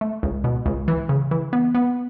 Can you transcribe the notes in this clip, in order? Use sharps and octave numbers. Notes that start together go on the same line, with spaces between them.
A3
C#2
B2
C#2
E3
C#3
E3
B3
B3